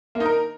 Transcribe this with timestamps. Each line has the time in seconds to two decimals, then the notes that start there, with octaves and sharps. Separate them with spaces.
0.15 A#3
0.20 D#4
0.25 A#4